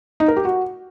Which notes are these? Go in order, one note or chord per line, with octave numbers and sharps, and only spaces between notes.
D#4
A#4
G4
F#4